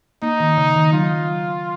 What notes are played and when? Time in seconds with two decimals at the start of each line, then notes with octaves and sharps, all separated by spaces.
0.22 A#3 D#4
0.40 D#3
0.58 C#3
0.76 D#3
0.93 F#3 F4